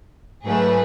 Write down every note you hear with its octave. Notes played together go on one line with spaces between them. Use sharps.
G#2 F#3 A3 G#4 B4